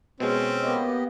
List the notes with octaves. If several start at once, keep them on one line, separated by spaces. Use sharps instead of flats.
B2 G#3 C4 C#4
A#3 B3 G4 D#5